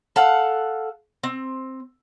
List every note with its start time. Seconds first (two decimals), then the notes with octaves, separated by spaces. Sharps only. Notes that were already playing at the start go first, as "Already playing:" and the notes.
0.16 A4 F5 F#5
1.23 C4